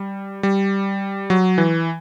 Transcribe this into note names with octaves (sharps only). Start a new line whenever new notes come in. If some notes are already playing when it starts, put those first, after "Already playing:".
Already playing: G3
G3
F#3
E3